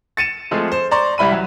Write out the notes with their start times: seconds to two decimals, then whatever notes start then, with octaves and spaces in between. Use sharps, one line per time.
0.17 A6 C#7 D#7 E7
0.51 F3 G#3 A3 C4
0.72 C5
0.91 C5 D5 A#5 C6 C#6
1.18 C2 G3 E4 B5 D#7
1.32 F#3